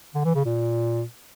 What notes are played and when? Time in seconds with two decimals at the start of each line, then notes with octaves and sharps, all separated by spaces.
0.15 D3
0.25 E3
0.35 C#3
0.45 A#2